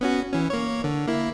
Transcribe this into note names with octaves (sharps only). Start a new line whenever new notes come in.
B3 C#4 F#4
E3 C#4
A#3 C#5
D3
A#3 E4